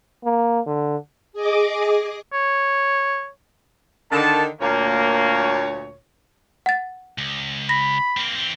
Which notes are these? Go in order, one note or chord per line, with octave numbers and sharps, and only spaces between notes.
A#3
D3
G#4 D#5 D6
C#5
D3 D#3 A5
D2 A#2 A#3 C#5
F#5 A6
C#2
B5 A#6
A#3 C4
E3 C4